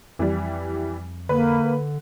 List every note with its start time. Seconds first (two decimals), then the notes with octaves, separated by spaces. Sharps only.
0.19 F2 E3 G3
1.29 D3 A#3 B4